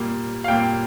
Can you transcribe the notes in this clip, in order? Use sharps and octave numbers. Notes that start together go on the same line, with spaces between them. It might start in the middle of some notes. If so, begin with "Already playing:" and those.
Already playing: A#2 G3 A#3
F5
A#2 G3 A#3 G5